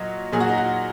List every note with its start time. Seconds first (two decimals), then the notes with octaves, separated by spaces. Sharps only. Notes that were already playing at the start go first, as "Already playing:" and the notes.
Already playing: A#2 F#3 D#5
0.32 A#2 F#3 G#4
0.40 F#4
0.49 D#4
0.57 F#4